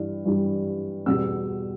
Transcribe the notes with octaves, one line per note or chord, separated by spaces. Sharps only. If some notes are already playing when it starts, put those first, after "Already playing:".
Already playing: G2 E3 G3
G2 E3 G3
E2 B2 G3 E6